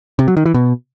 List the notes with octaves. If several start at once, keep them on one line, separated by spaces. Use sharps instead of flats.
C3
F#3
D#3
E3
B2